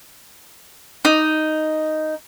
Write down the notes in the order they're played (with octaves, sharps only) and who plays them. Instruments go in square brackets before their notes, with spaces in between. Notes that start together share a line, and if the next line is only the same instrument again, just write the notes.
[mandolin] D#4